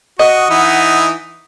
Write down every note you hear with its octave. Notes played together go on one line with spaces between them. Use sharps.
F#4 D#5 F#5
E3 D#4 E4